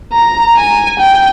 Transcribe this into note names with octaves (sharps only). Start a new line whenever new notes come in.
A#5
G#5
G5